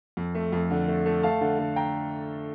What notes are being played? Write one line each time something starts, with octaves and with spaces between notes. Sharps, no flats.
F2
A3
F2
D3
A3
A3
A3 F5 A5
D3
D3
G5 A#5